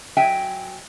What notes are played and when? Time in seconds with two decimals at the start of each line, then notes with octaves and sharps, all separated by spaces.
0.17 F#3 D#5 E5 G5 G#5